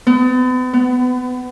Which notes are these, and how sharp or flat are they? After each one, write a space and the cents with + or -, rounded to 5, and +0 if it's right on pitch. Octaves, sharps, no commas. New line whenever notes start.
B3 +40
B3 +25